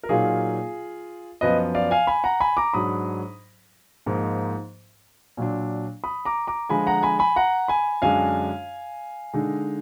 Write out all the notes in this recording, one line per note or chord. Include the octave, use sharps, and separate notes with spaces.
A#4
A#2 F#3 A#3 D#4 F4 G#4
F#2 F3 B3 B4 D#5
D5 F5
F5 G#5
G#5 B5
F#5 A#5
G#5 B5
A#5 D6
G#2 F#3 D4 B5 D#6
G#2 F3 A#3 D#4
A#2 F#3 D4
B5 D#6
A#5 D6
A#5 D6
D3 F3 G#3 G#5 B5
F#5 A#5
G#5 B5
G#5 B5
F#5 A#5
G#5 B5
F#2 D3 G#3 D4 F5 G#5
D3 G#3 D#4